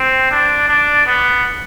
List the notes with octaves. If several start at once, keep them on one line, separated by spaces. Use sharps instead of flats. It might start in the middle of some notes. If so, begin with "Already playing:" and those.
Already playing: C4
D4
D4
B3